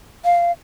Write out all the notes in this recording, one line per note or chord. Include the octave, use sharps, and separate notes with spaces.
F5